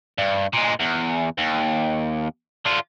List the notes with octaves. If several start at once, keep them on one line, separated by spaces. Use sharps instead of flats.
G2
A#2 G#3
E2
D#2
D3 F4